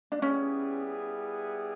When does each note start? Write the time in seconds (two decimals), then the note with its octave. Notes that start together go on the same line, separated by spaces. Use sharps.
0.12 D4
0.22 G3 B3 C#4 E4 G#4